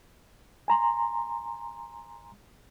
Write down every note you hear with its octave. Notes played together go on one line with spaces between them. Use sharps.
G#5 A#5 C6